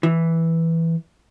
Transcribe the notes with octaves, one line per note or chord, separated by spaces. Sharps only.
E3